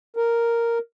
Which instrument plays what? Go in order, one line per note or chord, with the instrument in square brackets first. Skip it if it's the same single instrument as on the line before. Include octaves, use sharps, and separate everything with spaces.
[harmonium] A#4